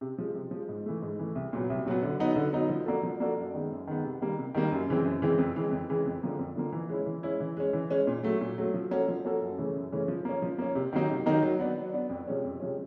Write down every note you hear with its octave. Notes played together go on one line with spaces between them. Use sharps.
C3
F3 G#3
C3
F3 G#3
G#2
E3 A3
G#2
E3 A3
C2
A#2 F#3 B3
C2
A#2 F#3 B3
D3
F#3 B3 D#4
D3
F#3 B3 D#4
F3
A#3 D4 F#4 A4
F3
A#3 D4 F#4 A4
F#2
D#3 G#3 B3
F#2
D#3 G#3 B3
C3
D#3 G3 A#3
C3
D#3 G3 A#3
F#2
C#3 E3 G#3 C4
F#2
C#3 E3 G#3 C4
F2
C#3 E3 G#3
F2
C#3 E3 G#3
F2
D3 F3 A#3
F2
D3 F3 A#3
E3
G#3 C#4 E4
E3
G#3 C#4 E4
E3
G#3 C#4
E3
G#3 C#4
A#2
F#3 A3
A#2
F#3 A3
F3
A#3 C#4 F#4 A4
F3
A#3 C#4 F#4 A4
F#2
C#3 E3 A3 C#4
F#2
C#3 E3 A3 C#4
F3
A#3 C#4
F3
A#3 C#4
C3
D#3 F#3 A#3 D#4
C3
D#3 F#3 A#3 D#4
F#3
B3 D4
F#3
B3 D4
F2
C3 F3 G#3 C#4
F2
C3 F3 G#3 C#4